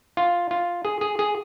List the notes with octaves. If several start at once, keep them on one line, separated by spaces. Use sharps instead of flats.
F4
F4
G#4
G#4
G#4